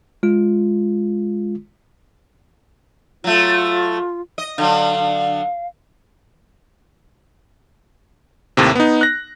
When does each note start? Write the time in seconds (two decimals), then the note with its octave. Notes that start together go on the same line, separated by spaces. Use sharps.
0.23 G#3 F4
3.24 F#3 A3 F4
4.38 D#5
4.58 D3 F#3 F5
8.57 D#2 A2 C3
8.75 B3 D#4
9.01 F#6 A#6